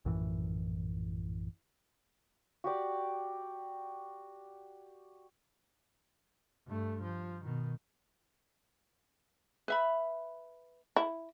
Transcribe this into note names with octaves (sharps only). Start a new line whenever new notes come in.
A#1 F#2 A2 E3
F#4 G4 D5
G2 A3
F3
B2 D#3
B4 E5 B5
E4